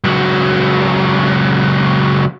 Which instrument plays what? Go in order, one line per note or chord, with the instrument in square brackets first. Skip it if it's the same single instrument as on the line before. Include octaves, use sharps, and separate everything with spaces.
[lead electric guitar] C#2 F#3